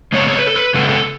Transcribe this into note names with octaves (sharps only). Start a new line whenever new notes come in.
C#3 G#3 B3 C#5
C#5
B4
A4
B4
C#3 G#3 B3 A4
A4